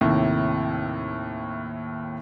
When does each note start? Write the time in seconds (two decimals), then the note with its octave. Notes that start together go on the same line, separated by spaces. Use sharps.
0.01 D#2 A2 C3